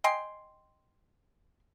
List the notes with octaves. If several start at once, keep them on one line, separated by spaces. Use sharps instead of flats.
D#5 G5 G#5 C6